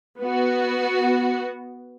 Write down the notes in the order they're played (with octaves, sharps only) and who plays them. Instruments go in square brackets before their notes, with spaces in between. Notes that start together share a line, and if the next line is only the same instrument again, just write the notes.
[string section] B3 F#4